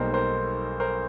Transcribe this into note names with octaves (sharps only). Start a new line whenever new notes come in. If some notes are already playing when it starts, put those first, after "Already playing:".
Already playing: B1 B2 G3 A#3 D#4 A4 A#4 C5
A#4 C5
A#4 C5